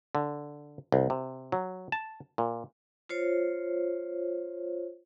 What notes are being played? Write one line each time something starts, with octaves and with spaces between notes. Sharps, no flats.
D3
C2
C3
F#3
A5
A#2
F4 C5 C#5